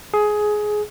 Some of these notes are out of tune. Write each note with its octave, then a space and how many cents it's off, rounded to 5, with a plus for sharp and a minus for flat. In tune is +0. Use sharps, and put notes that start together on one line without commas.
G#4 +15